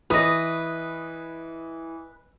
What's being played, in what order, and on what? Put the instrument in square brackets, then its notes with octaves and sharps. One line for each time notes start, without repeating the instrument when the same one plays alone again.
[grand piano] E3 D#6 [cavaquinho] B4 D#5